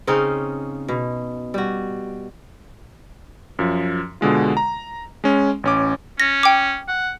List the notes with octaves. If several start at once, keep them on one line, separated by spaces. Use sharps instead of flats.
C#3 C4 C#4 D#4
B2
G3 F#4
F#2 F3
B2 D3 G#3 F4
A#5
G#3 C#4
A1 C#4 D6
C#4 A#6
G5 D6
F#5